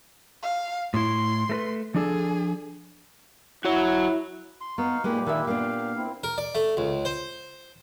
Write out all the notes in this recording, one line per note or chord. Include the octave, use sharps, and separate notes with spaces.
F5
A2 E4 C6
A3 A#4 B4
F3 D4 G#4 A4
E4 F#4 C#5
C6
B3 D#4 F5 C#6
A#2 G#3 A#3 D#4 G4 B4
D#3 G#3 D4 E4 E5
A#3 B3 D4 F5
C4 E4
A#4
D5
A3
C#2
C5